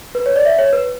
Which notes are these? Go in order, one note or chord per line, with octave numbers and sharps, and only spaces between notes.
B4
C#5
D5
E5
C#5
B4